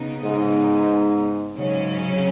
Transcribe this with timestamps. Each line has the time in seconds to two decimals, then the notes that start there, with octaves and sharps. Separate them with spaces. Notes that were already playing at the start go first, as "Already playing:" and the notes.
Already playing: C#3 B3 D#4
0.24 G#2
1.57 G#2 C#3 F#3 C#4